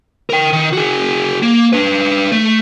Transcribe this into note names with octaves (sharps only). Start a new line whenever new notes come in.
A#4 G5
D#3
F#4 G#4
A#3
D4 B4
A3